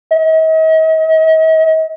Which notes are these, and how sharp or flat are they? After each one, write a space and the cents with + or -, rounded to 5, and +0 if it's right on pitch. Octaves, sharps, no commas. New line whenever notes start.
D#5 +45